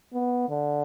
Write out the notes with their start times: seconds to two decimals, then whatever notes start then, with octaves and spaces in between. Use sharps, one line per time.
0.13 B3
0.50 D3